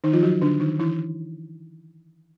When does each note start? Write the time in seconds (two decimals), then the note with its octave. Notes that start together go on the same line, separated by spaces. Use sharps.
0.04 D#3 D#4
0.13 F3 F4
0.23 F#3 F#4
0.42 D3 D4
0.60 D#3 D#4
0.79 E3 E4